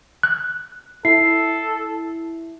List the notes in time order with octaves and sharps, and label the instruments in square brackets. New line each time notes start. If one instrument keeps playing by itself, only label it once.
[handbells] F#6
[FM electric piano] E4 [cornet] A4 [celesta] C7